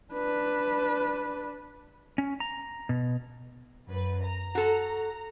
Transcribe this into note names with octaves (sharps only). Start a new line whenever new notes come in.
D4 B4
C#4
A#5
B2
F#2 B4
A#5
F#4 A4